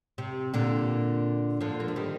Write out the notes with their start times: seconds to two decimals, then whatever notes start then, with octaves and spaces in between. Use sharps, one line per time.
0.18 C3
0.54 A#2 D3
1.61 D3 F3
1.80 A#3
1.88 A3
1.96 D#3 G3